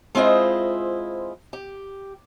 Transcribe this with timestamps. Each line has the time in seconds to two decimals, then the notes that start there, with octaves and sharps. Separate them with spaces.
0.15 G#3 C4 E4 F4 C5 D#5
1.53 G4